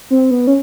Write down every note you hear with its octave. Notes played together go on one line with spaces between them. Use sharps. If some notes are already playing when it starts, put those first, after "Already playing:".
C4
B3
C#4